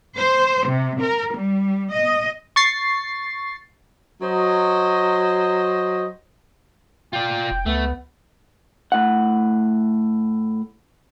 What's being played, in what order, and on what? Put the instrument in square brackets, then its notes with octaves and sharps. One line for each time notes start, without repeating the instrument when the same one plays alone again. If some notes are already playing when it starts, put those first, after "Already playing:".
[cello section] C5
C3
A#4
G3
D#5
[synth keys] C#6 A6 C7
[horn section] F#3 C5 D#5
[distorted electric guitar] F4 D5 [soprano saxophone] G5
[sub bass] F1
[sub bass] C#2 [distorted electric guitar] A3 [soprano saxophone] B3
[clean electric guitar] A2 F#5